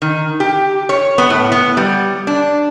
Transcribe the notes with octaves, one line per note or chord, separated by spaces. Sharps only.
D#3
G4
C#5
B3
A2
B3
G3
D4